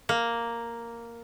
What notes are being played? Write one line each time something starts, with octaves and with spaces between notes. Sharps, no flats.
A#3